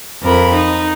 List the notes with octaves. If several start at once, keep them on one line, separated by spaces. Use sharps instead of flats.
F2 A#4 B5
D#4